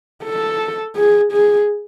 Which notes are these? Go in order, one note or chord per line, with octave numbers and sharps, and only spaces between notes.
A4
G#4
G#4